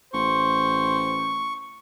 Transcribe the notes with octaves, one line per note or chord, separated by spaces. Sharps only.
A1 C5 C#6